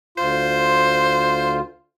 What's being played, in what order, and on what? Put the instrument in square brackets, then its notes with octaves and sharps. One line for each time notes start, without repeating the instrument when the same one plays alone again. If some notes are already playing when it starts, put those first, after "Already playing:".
[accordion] D2 F4 [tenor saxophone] C5